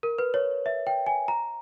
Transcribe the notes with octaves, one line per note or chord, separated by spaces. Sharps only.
A#4
B4
C#5
E5
G5
G#5
A#5